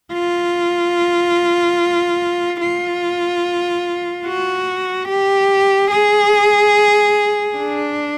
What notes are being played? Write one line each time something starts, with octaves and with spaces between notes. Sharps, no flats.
F4
F4
F#4
G4
G#4
D4